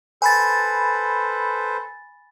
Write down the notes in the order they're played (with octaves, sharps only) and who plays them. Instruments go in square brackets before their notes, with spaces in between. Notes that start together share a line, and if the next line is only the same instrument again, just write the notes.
[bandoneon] A4 B4 C5 [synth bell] G#5 B5 A6